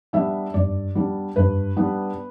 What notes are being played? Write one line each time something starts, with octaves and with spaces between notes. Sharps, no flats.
G3 B3 D4 E5
G2 D5
G3 B3 D4
G2 B4
G3 B3 D4